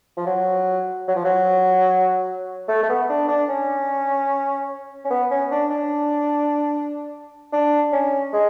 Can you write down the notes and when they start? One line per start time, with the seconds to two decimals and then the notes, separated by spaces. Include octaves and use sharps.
0.17 F3
0.26 F#3
1.08 F#3
1.16 F3
1.25 F#3
2.68 A3
2.83 A3
2.89 B3
3.09 D4
3.29 D4
3.49 C#4
5.05 C#4
5.11 B3
5.31 C#4
5.51 D4
5.70 D4
7.53 D4
7.92 C#4
8.33 G#3